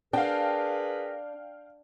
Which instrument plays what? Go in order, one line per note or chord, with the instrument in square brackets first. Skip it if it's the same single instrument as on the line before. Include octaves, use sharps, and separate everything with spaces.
[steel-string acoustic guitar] D4 [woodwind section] G#4 A#4 B4 [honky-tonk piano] F5 G5